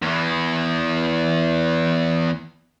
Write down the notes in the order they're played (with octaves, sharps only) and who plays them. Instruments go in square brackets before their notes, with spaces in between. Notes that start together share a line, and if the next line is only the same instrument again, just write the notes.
[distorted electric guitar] E2 E3